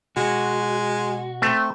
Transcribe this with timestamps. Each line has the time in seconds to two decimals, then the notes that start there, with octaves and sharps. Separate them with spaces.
0.17 B2 G#3 F#4
1.42 A3 C4